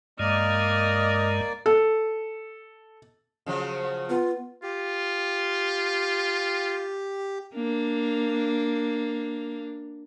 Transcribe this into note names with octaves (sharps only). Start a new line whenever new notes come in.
G2 G#3 A#3 D5 D#5 F6
A4
C#3 F3 F#3
B3 F4
F4 G4
A#3 D4